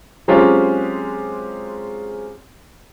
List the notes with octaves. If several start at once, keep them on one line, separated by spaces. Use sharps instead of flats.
F#3 G#3 C4 C#4 F4 G4